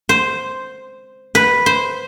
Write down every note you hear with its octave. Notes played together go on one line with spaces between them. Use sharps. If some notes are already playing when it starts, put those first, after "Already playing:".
C5
B4
C5